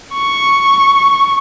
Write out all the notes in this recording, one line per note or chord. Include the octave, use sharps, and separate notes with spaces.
C#6